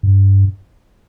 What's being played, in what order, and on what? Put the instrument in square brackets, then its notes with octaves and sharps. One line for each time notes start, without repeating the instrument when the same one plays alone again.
[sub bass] G2